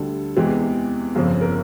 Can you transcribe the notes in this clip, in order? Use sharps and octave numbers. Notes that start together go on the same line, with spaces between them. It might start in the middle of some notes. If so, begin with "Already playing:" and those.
Already playing: D2 D3 G3 A4
E2 C3 E3 G#3 G4
G1 F2 C#3 F3 G#4
A#4